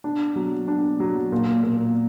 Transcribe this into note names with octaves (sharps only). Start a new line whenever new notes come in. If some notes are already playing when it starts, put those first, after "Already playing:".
D4
F#3
D4
F#3
A#2
A#2